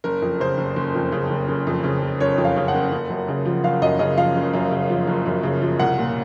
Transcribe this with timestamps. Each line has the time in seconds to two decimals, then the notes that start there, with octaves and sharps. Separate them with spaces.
0.04 F#1 A#4
0.22 F2
0.40 C#3 C5
0.58 F#1
0.76 F#1
0.95 F2
1.12 C#3
1.30 F#1
1.48 F#1
1.67 F2
1.84 C#3
2.02 F#1
2.20 F#1 C#5
2.38 F2
2.45 F5
2.56 C#3
2.68 F#5
2.74 F#1
2.92 F#1
3.10 F#2
3.28 C#3
3.46 F3
3.64 F#1 F5
3.82 F#2 D#5
3.99 C#3 D#5
4.17 F3 F5
4.36 F#1
4.53 F#2
4.71 C#3
4.90 F3
5.07 F#1
5.26 F#2
5.43 C#3
5.62 F3
5.79 C2 F#5
5.98 A#2